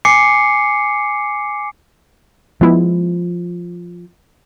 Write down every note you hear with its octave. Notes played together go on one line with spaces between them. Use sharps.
G#5 D6 C7 C#7
F3 G#3 B3 E4